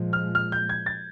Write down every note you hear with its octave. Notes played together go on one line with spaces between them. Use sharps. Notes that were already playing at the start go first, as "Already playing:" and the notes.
Already playing: A#2 F3 G#3
F6
F6
G6
G#6
A6